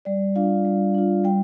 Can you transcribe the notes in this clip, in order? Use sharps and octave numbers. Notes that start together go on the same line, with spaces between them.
G3 D5
D4 F4 F5
G3
D4 F4
G3 G5